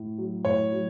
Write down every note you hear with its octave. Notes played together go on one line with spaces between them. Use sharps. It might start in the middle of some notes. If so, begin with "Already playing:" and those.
Already playing: A2
F#3
A2 C#5
F#3